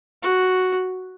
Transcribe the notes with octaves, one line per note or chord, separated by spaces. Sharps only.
F#4